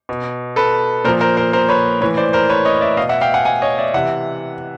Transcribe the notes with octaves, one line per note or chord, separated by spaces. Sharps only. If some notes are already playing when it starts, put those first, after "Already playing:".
B2
A4 B4
A#2 F3 A#4 C5
A#4 C5
A#4 C5
A#4 C5
B4 C#5
A2 E3 B4 C#5
C5 D5
A#4 C5
B4 C#5
C#5 D#5
D5 E5
B2 D#5 F5
E5 F#5
F5 G5
F#5 G#5
F#5 G#5
C#5 D#5
D5 E5
C3 E3 E5 F#5